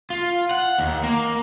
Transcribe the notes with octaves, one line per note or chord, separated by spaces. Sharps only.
F4
F#5
D#2
A#3